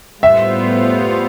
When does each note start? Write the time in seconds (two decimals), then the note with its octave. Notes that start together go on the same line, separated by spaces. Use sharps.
0.23 A2 G3 B3 F4 C5 E5